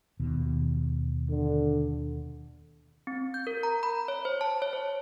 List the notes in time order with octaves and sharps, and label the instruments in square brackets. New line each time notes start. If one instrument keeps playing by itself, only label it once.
[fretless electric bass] D#2 B2 D#3
[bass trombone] D3
[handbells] C4
G6
A#4
A#5
B5
C#5
C5
A5
C#5
C5